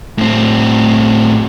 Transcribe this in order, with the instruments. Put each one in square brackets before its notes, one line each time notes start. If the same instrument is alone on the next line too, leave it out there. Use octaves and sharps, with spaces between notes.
[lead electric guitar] A2 C4